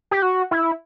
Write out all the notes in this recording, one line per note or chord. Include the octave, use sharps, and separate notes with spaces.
G4
F#4
E4